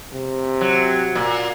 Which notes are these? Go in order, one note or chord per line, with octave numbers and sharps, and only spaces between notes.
C3
F#3
A#2